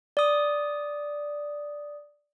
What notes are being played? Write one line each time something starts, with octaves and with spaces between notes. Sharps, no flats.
D5 D#6